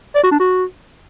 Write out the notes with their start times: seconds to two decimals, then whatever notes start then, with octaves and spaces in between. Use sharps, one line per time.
0.15 D5
0.23 F#4
0.32 D4
0.40 F#4